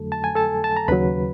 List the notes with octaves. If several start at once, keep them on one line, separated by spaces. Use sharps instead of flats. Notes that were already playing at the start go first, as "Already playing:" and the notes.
Already playing: F2 D3 F#3 A3 A4
A5
G#5
A4 A5
A5
A#5
D#2 C#3 F#3 B4 B5